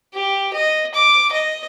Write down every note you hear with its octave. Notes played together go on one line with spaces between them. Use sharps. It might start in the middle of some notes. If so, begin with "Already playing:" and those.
G4
D#5
D6
D#5